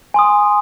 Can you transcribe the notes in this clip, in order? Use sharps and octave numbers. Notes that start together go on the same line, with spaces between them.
G#5 C6 D#6